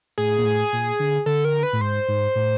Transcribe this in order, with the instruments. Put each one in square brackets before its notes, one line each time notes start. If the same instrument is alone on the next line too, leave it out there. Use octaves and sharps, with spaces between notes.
[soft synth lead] A2 [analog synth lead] G#4
[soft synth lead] A#2
A2
A#2
D3
[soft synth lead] D3 [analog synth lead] A4
[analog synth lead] A#4
B4
[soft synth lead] A2
[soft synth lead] G#2 [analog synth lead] C5
[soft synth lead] G#2
A2